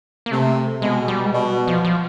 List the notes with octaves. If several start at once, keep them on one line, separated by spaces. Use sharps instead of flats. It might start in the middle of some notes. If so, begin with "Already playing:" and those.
A#3
C3 A3
B2 G#3
G3
G#3
B2 G3
F3
F3